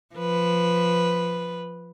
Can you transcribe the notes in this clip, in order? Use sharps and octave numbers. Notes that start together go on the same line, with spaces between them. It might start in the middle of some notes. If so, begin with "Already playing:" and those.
F3 B4